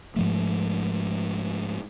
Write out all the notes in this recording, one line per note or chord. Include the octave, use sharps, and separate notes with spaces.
G#2 F3 A3